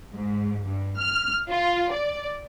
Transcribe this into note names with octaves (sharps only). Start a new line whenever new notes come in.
G#2
G2
F6
F4
D5